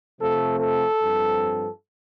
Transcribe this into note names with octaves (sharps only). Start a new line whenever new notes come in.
C3 F3 A3 C4 A4
A4
G2 F3 C4